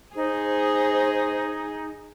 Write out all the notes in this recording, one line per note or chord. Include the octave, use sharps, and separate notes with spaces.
D#4 G#4 C5